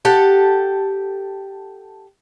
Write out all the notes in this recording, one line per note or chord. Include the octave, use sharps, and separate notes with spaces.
G4 A4 F#5